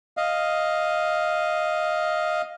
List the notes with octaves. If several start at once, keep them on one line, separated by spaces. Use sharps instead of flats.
D#5 F5